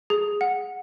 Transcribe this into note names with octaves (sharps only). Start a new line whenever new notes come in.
G#4
F#5